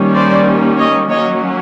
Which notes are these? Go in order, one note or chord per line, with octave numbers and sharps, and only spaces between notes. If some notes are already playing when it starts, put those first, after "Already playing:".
Already playing: D#3 G3 A#3 C#4
C5 D5
C#5 D#5
F#3 A#3 C#4 C#5 D#5